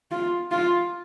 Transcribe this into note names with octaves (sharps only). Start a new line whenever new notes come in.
F4
F4